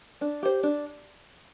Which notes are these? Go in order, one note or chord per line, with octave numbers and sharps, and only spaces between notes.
D4
G4 C5
D4